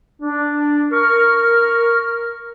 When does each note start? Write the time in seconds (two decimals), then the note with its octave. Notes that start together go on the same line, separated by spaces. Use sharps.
0.22 D4
0.92 A#4 C#6 F6